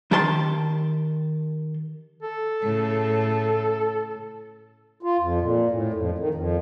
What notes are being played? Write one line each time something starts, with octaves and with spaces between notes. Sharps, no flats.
D#3 G4 A5 C6
A4
A2 C#3
F4
F2
A#2
A2
F2
D#3
F2